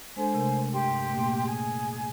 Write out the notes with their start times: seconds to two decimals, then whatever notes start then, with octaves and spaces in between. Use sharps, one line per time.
0.16 G#3 D4 A4 C5 G#5
0.35 C3 A3 A#4
0.73 G2 G4 G5 C6
1.10 A#2 A3 A#3
1.47 G#4 G#5